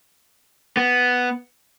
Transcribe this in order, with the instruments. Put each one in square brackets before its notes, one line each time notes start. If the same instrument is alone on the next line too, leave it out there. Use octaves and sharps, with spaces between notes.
[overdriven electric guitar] B3